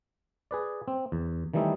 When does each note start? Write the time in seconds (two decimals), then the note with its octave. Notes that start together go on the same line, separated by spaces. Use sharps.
0.51 G#4 B4 D5
0.88 C4
1.12 E2
1.54 D#3 E3 G3 A3 D#4 E4